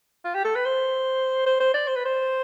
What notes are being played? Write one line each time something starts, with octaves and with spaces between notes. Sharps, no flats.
F4
G4
A4
B4
C5
C5
C5
D5
C5
B4
C5